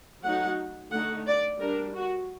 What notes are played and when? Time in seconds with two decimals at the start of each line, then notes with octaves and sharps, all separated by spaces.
0.24 F#3 A3 D#4 F#5
0.92 D3 A3 D#4 F#5
1.26 D5
1.60 G3 D4 A#4
1.95 F#4